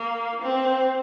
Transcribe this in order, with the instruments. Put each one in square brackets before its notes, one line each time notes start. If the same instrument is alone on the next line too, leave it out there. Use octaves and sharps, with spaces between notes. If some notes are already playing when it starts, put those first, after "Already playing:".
Already playing: [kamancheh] A#3
C4